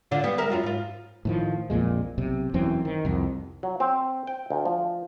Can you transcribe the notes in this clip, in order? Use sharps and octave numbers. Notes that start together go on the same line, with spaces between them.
D3 D4 F4
G3 B3
G#3 A#4 E5
F#2 F4 F#4
G#2 F4
A2 D#3 F3
A#1 F2 A#2 G#3
B1 C3
E1 F#2 E3 C4
D#3
C2 F2
F#3
C4
G5
D2
F3